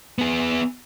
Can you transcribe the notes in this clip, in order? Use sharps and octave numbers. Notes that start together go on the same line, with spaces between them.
B3 G#4